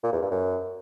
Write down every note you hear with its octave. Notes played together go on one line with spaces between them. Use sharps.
A#2
E2
G2
F#2